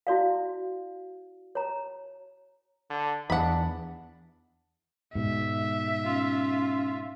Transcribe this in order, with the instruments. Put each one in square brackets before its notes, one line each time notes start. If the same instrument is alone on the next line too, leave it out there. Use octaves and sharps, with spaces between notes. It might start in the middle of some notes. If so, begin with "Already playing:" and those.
[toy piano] E4 F#4 D5 F5
C#5 A#5
[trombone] D3
[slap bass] E2 E3 [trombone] D4 [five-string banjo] F#5 B5
[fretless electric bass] G#2 B2 [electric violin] E5
[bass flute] C#4 [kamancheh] F4